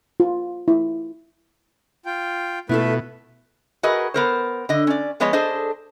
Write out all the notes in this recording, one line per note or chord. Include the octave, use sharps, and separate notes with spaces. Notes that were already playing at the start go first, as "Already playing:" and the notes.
F4
E4
F4 G5
B2 A3 E4 F4 A4 B4
F#4 G#4 A#4 B4 D#5
B3 A#4 C5
D3 D#5
C#4 D5
F3 G#3 B3 C#5 D#5
D4 G#4 A4 C5 D#5